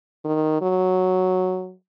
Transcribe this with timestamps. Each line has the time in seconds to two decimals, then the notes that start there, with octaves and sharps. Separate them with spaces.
0.25 D#3
0.62 F#3